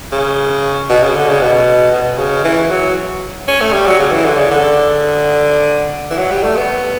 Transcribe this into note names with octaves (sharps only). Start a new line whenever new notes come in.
C#3
B2
C#3
D3
C#3
B2
B2
C#3
E3
F#3
C#4
A3
G3
F#3
C#3
E3
D3
C#3
D3
E3
F#3
G3
A3
B3